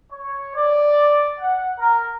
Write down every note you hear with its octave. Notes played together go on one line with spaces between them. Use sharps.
C#5
D5
F#5
A#4